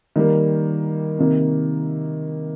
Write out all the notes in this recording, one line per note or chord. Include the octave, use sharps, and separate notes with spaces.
D#3 G3 A#3
C3 D#3 A#3